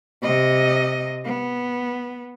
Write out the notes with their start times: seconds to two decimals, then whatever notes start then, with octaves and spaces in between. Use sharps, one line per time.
0.23 C3 D#5
1.25 B3